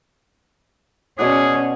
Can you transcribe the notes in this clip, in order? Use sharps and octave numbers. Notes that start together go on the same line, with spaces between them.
B2 C#4 G#4 D5 F#5